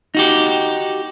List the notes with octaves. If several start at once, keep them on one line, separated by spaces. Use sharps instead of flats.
D#4 F#4 G4